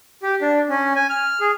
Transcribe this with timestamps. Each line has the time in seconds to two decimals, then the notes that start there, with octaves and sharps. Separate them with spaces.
0.23 G4
0.41 D4
0.69 C#4
0.95 G#5
1.10 F6
1.40 G#4